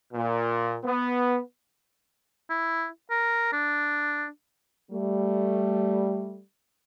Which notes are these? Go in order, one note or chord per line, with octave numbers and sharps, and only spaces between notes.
A#2
B3
E4
A#4
D4
G3 A3